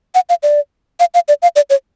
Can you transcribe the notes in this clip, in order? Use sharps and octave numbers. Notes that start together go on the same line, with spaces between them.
F#5
F5
D5
F5
F5
D5
F5
D5
C#5